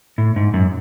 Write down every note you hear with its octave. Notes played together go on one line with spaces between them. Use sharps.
A2
G#2
F#2